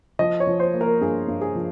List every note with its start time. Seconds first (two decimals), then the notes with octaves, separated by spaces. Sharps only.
0.19 F3 D#5
0.40 C#5
0.47 F3
0.60 C5
0.74 A#3
0.81 A#4
1.01 G2 G#4
1.28 G2
1.41 G#4
1.55 F3